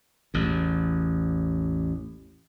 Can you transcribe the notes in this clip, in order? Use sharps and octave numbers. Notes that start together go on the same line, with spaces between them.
A1 E2